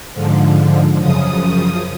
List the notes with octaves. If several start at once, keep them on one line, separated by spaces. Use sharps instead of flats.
G#2 D3 F3
F#2 C#3 F3 D#6